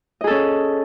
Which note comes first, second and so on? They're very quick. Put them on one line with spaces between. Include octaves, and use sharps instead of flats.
D#5 G#4 A4 C#4